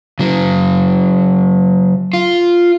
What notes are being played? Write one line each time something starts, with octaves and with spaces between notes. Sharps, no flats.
C#3 F#3
F4